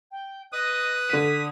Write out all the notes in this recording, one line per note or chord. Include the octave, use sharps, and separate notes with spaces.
G5
B4 D#5 D#6
D3 B6 D#7